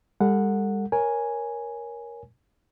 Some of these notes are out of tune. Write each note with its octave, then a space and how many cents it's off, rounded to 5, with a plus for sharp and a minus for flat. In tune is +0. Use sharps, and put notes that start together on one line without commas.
G3 +45 A4 +35 F#5 -10
A#4 +15 C#5 +0 G#5 +0